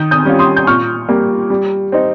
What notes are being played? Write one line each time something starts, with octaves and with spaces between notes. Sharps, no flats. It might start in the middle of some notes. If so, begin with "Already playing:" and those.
Already playing: D#3 D#6 G6
D#6 G6
G3 C#4 F4
C6 D#6
G6
A#2 C#6 F6
G3 A#3
G3
C4 D#4